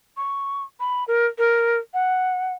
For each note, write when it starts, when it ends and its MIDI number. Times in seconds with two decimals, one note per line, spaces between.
0.17 0.63 85
0.80 1.04 83
1.08 1.27 70
1.38 1.78 70
1.94 2.54 78